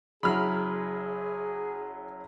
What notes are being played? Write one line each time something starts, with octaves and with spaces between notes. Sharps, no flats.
F#1 F#3 E4 G#4 B5 F6